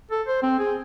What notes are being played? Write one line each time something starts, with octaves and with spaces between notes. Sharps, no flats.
A4
C5
C4
G#4